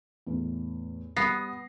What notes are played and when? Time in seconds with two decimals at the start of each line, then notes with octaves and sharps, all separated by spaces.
0.27 E2 A2
1.17 G3 B3 D#6 A#6 C7